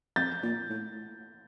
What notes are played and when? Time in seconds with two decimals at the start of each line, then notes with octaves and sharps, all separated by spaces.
0.16 F2 G6 A6
0.43 A#2
0.69 A2